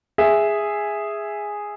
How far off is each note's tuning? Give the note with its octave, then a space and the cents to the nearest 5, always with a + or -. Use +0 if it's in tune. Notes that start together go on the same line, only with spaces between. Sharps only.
G#4 -5 E5 +0